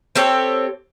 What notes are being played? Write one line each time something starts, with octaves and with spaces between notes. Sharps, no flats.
C4 G4 A4 C#5